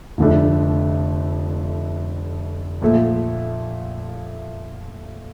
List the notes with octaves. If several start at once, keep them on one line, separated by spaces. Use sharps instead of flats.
F1 F2 D3 A3 D4
A#1 A#2 F3 A3